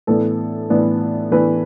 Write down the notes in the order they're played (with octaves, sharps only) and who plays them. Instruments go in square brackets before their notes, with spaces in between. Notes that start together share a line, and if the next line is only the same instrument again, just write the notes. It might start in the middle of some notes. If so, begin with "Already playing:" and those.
[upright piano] A2 E3 B3 D4 A4
A2 E3 B3 D4
A2 E3 B3 D4 B4